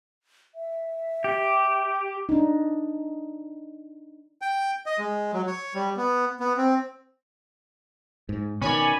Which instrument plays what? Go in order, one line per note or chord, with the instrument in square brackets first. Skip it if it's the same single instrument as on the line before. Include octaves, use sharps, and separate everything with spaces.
[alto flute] E5
[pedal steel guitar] G4
[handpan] D4 D#4
[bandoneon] G5
D#5
G#3
F#3
C#5
G3
B3
B3
C4
[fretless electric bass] G#2
[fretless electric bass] B2 D#3 [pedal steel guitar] C#4 D5 [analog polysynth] C#5 G#5 B5